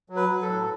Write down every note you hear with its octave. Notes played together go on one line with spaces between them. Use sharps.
F#3
B4
F#3
A4
A2